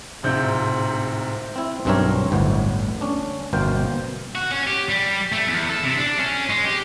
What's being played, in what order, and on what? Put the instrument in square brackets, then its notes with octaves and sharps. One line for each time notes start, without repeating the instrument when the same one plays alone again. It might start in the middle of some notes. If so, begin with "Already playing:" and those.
[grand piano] D1 G#2 C3 C4 F4 G6
[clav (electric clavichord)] C4 E4
B1 G2 C4 D4 A#4 C#5
G1 D2 A2 B3
C#4 D4
G1 B2 A#3 C5 F5 G5
[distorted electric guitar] F#4
C#4
G4
G3
A3
E2
A4
C3
D4
C#4
G#3
G4